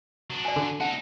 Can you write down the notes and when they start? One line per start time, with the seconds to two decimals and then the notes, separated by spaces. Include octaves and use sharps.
0.30 F#3 D4
0.45 D5 G#5
0.56 D3
0.81 D#4 E4 F#5 A5